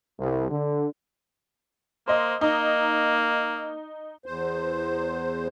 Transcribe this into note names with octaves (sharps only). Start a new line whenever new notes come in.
C2
D3
A#3 C5 D#5
A#3 D#4
E2 C5